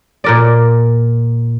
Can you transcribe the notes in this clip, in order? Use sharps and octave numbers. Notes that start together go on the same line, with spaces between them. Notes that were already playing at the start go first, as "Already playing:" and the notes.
A#2 A#4 D5